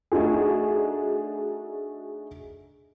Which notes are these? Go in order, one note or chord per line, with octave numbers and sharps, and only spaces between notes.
A3 D4 D#4 F#4 G#4